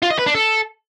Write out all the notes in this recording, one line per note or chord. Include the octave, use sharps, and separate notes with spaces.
F4
D#5
B4
D4
A4